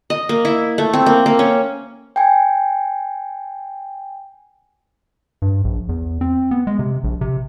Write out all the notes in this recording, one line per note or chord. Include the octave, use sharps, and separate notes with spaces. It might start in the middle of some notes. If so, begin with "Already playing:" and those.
D#5
A#3
E4
A3
C4
A#3
A#3
C#4
G5 G#5
G2
A#1
E2
C4
B3
G#3
C3
A#1
C3